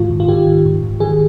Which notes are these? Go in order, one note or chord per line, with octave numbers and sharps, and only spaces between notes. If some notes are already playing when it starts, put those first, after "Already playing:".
Already playing: G#2 D#3 F4
G#2
F4
D#3 G4
D#3
G#2
G#2
D#3 G#4